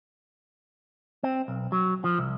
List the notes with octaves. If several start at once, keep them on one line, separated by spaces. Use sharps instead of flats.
C4
B1
F#3
F3
C2